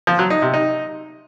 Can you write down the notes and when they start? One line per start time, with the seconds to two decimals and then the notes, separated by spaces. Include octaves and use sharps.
0.07 F3
0.19 F#3
0.30 D#4
0.42 C3
0.54 D#4